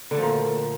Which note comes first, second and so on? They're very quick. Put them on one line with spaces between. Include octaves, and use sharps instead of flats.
D3 A3 F3 A#2